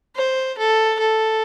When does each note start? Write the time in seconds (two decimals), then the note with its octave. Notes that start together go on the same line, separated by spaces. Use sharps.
0.17 C5
0.58 A4
1.00 A4